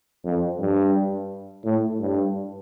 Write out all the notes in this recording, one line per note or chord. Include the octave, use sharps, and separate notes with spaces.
F2
G2
A2
G2